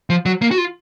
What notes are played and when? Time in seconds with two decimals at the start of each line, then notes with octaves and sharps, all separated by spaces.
0.10 F3
0.26 F#3
0.41 A#3
0.51 F#4
0.58 F4